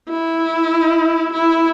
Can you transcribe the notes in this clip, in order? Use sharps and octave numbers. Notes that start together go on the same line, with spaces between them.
E4
E4